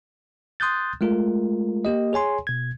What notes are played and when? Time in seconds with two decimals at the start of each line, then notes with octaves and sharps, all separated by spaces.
0.60 C6 D#6 F#6 G6 A6
1.01 G#3 A3 F4 A#4
1.85 A#3 G4 D#5
2.13 G#4 C#5 G#5 C6
2.47 B2 G#6